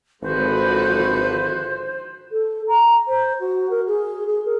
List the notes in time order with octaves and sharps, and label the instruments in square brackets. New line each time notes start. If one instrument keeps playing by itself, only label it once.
[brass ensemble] G#1 B4 [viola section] D3 F3 F#4 [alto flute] C5
[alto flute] A4
A#5
C5
F#4
A#4
G#4
G#4
A#4